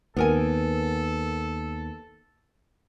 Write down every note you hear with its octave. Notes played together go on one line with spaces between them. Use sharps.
D#2 B3 A4 A#4 G#5